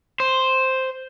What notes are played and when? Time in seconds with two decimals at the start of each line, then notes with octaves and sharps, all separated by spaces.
0.20 C5